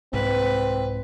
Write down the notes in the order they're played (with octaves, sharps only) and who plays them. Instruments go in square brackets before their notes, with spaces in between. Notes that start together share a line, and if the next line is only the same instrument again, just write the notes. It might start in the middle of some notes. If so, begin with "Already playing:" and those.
[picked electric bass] C2 G#2 [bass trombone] C4 [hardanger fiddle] B4